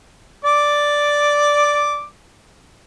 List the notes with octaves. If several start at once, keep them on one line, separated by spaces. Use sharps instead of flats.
D5 D6